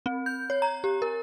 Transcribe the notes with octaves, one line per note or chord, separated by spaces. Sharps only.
C4
G6
C#5
A#5
G4
A#4